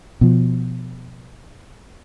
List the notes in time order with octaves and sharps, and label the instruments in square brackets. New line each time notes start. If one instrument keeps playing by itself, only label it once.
[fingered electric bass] B2 F3